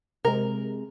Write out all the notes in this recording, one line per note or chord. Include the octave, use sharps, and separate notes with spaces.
C3 G#3 A#4